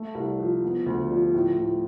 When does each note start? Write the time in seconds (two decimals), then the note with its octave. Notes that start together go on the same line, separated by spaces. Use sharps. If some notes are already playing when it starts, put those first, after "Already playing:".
Already playing: A3
0.15 C2
0.39 F3
0.63 B3
0.86 D2
1.10 F3
1.34 A2
1.58 A2